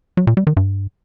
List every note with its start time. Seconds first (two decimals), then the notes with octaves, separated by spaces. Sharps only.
0.17 F#3
0.27 A#2
0.37 G3
0.47 D#3
0.57 G2